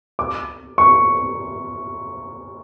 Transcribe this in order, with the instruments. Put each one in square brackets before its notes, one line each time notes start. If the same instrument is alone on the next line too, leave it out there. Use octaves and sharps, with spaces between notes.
[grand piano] D6
C#6